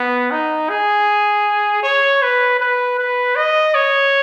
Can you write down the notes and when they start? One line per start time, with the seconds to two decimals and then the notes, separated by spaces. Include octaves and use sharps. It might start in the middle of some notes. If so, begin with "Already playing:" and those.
Already playing: B3
0.31 D#4
0.70 G#4
1.83 C#5
2.22 B4
2.60 B4
2.98 B4
3.36 D#5
3.75 C#5